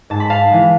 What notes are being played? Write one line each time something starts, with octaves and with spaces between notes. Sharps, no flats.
G#2 A5
B5
F5 A5
E3 G#3